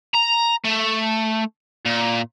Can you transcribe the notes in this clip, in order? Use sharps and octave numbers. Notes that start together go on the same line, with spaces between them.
A#5
A3
A#2